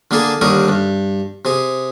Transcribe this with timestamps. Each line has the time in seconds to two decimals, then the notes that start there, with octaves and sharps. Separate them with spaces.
0.11 D3 A#3 G#4 A4 G#5
0.41 D#2 D3 G3 A#4 C#6 D#6
0.69 G2
1.45 C3 G#4